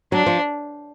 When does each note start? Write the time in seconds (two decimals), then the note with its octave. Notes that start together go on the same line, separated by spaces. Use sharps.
0.12 F#3 D4
0.26 F3